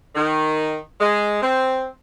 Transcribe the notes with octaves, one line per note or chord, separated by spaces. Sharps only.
D#3
G#3
C4